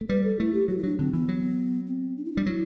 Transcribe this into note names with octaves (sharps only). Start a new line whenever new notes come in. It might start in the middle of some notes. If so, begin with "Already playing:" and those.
A3
G3 B4
A4
A3 E4
G4
F#3 F#4
E4
F#3 D4
D3 C4
E3 B3
F#3
C4
D4
E4
G3 D4
F#3 E4